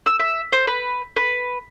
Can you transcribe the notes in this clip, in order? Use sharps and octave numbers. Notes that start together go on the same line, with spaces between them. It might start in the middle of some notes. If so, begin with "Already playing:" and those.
E6
E5
C5
B4
B4